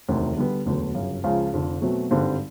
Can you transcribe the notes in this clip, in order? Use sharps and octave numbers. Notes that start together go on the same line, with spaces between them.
E1 D2 C3 D#3
D3 G3 B3
E1 D2 D3 F#3 B3
G1 F#2 C#3
C#2 C#3 F3
F1 F2 D3
B2 F#3 A3 C4
G#1 G2 D3 G3 C4